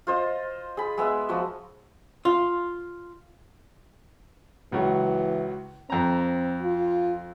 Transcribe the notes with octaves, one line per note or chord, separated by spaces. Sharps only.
F4 C5 D#5
G#4 B5
G#3 B3 E5
F3 F#4
F4
C#2 E3 F#3
F2 C4 A#5
F4